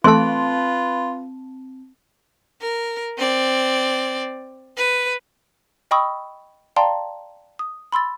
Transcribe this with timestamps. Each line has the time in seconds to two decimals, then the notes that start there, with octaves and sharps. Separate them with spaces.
0.04 E3 A3 C4 F4 A4 B4 A5 C6
2.62 A#4
3.18 C4 D5
4.77 B4
5.91 D#5 G5 B5 C#6 D#6 E6
6.76 D5 F5 G5 A5 A#5 C6
7.59 D#6
7.92 B5 C6 E6 A6